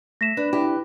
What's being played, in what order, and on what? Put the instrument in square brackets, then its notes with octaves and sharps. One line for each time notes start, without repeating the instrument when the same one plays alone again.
[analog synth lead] A3 [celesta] A#6 B6 E7
[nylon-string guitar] D4 [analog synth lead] B4
[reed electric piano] D4 E4 [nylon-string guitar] G4